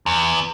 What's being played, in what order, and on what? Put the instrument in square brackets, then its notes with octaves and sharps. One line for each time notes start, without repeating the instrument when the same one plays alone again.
[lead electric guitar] E2